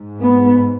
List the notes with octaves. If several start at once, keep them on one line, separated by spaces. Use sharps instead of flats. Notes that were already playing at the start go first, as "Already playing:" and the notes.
Already playing: G#2
B3